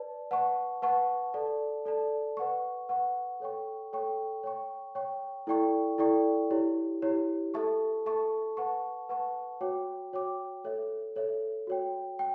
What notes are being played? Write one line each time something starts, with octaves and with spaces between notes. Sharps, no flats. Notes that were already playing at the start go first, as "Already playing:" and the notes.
Already playing: B4 D5 A5
B4 F#5 A5 C#6
B4 F#5 A5 C#6
A4 D5 A5
A4 D5 A5
B4 F#5 C#6
B4 F#5 C#6
A4 C#5 G5 C#6
A4 C#5 G5 C#6
C#5 G5 C#6
C#5 G5 C#6
E4 A4 D5 G5 C#6
E4 A4 D5 G5 C#6
E4 G4 C#5
E4 G4 C#5
A4 E5 A5 C#6
A4 E5 A5 C#6
B4 F#5 A5 C#6
B4 F#5 A5 C#6
F#4 C#5 G5 D6
F#4 C#5 G5 D6
A4 C#5 E5
A4 C#5 E5
F#4 C#5 G5
G5